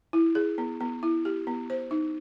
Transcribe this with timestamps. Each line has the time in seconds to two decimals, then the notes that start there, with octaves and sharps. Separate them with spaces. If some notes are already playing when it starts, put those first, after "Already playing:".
0.13 E4
0.35 G#4
0.58 B3
0.80 B3
1.03 E4
1.25 G4
1.47 B3
1.70 C5
1.91 D#4